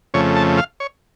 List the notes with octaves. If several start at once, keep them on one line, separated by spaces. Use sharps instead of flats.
F2 C#3 A3 C#5
A5
F5
C#5